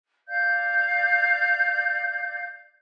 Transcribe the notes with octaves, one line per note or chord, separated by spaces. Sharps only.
D5 F5 G6